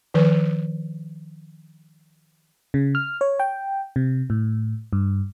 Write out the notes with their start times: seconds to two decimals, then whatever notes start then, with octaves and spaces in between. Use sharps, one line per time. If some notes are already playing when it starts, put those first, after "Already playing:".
0.14 D#3 F3 B4
2.74 C#3
2.95 F6
3.21 C#5
3.40 G5
3.96 C3
4.30 A2
4.93 G2